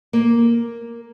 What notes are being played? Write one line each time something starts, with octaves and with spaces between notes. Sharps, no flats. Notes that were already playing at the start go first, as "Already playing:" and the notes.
A#3